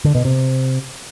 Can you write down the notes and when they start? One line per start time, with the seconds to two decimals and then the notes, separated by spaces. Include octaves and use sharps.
0.04 D3
0.15 B2
0.25 C3